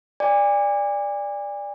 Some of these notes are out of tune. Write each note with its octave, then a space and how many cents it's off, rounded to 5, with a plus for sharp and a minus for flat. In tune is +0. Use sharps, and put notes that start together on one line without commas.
D5 +0 G#5 -40